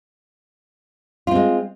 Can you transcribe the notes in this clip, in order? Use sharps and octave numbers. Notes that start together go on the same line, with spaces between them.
G#3 C4 F4